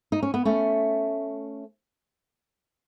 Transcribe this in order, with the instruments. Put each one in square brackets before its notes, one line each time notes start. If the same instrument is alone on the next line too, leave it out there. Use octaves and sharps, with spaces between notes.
[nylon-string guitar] D#4
C#4
B3
A3 C#4